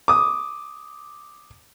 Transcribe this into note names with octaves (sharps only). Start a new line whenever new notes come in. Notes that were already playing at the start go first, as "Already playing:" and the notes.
D6 D#6